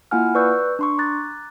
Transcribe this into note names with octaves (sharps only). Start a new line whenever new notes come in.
A#3 E4 F4 F#5 G#5 F6
B4 D5 C#6 E6 F#6 G6
D4 C6 C#6
A#5 D6 F#6 A6